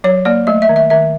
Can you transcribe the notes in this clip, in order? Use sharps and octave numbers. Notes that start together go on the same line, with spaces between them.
F#3 C#5
A#3 D5
A3 D#5
E5
D#3
E5
D#3 E5